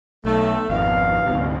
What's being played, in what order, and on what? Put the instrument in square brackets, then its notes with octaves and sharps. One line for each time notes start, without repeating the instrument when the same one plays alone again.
[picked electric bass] B1 [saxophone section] A3
[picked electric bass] G#1 F2 [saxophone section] D#3 B3 F5
[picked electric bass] D2 G#2 C3